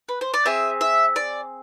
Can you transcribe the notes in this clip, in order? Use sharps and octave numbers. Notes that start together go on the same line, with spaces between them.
B4
C5
D5
C4 G#4 E5
E5
D5